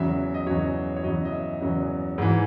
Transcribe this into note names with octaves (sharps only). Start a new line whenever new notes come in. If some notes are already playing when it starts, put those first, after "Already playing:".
Already playing: E2 C#3 F#3 E5
D#5
E2 C#3 F#3 C#5
C#5
E2 C#3 F#3 D#5
D#5
E5
E2 C#3 F#3
G#2 E3